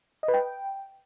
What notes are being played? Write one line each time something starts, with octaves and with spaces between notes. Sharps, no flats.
D#5
B4
G5